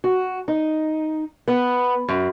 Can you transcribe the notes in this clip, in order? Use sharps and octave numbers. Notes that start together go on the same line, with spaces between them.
F#4
D#4
B3
F#2